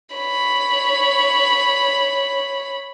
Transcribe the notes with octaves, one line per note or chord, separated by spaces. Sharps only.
C#5 B5